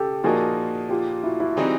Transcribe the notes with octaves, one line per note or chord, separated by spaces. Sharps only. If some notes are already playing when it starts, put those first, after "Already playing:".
Already playing: C#3 G4 A4
A#2 F3 A#3 D#4 F#4 G#4
F4 G4
E4 F#4
E4 F#4
E3 G3 C4 D#4 F#4 G#4